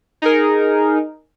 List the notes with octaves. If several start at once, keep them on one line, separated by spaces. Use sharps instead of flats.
D#4 G#4 A#4